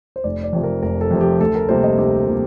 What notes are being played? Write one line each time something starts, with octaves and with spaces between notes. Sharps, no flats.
C5
F1 D5
D5
F2 C3 F3
A#4
F1 A#4
A4
F2 C3 F3
G4
D2 A4
A#4
C3 G3 A#3 C5
D#5
D2 G4
A4
C3 G3 A#3